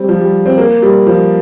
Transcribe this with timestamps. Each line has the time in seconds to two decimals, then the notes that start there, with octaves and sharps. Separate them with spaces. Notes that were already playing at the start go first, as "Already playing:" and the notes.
Already playing: G3 C4
0.09 F3
0.21 G3
0.46 C4
0.58 A#3
0.82 G3
1.07 F3